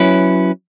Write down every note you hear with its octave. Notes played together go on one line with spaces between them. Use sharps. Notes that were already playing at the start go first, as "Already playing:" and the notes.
Already playing: F#3 C#4 E4 B4